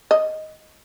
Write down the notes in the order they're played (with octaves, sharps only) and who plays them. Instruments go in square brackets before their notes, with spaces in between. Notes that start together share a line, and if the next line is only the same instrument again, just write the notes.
[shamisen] D#5